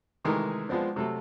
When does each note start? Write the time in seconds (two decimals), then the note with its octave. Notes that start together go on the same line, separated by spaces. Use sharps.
0.25 C3 D#3 E3 G#3 A3 A#4
0.69 F3 G#3 B3 C4 D4
0.96 C3 F#3 A3 A4